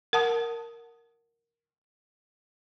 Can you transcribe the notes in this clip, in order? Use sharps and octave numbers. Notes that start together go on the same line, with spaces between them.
A#4 F#5 A5 D#6